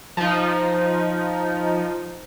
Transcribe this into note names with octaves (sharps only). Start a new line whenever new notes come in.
F3 D#4